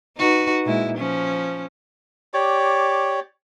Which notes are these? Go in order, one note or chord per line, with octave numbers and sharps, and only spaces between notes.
D#4 F#4 B4
A#2 G#3 E4
F3 C#4
G4 C#5 D5